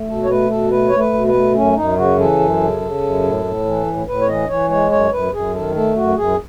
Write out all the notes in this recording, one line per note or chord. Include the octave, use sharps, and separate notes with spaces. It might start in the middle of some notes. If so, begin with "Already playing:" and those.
Already playing: A3
B2 A4
C#5
A3 B4
B2 A4
A3 B4
A3 C#5
B4
B2
B4
A3
F#2 C#4
F#2 D#4
C#3 F#4
E3 A4
F#2
C#3
C#3
F#2
A2
A2
E3
A2
A2 B4
C#5
E3 D#5
E3 C#5
G#3 C#5
F#2 C#5
F#2 B4
F#2 G#4
D#3 A4
A3 A4
F#2 F#4
F#2 G#4